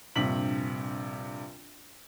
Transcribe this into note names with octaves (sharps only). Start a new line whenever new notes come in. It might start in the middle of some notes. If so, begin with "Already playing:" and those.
A#1 G2 C3 B6 F#7